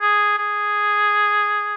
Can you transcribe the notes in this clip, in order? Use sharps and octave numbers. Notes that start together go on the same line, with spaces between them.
G#4
G#4